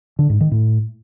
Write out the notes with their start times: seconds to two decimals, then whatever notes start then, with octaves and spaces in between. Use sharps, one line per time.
0.19 D3
0.30 G#2
0.41 D#3
0.51 A2